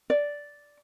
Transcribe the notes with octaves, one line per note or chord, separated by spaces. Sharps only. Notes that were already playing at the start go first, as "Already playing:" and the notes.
D5